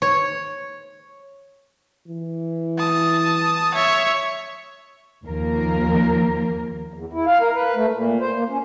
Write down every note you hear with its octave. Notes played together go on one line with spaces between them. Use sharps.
C#5
E3
A5 D#6
C#5 E5
D#2 F3 A#3 A#4
E2
E4
F5
A#4
B4
A3
A#2
C5
A#3
C#4